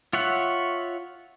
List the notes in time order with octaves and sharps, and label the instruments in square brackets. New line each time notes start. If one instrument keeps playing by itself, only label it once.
[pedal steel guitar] F4 C#5 E5 F#5